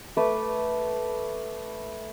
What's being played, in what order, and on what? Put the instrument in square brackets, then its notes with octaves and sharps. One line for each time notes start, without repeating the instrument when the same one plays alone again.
[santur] A3 B4 D6